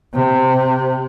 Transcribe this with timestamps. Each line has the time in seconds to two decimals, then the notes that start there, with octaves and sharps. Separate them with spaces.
0.14 C3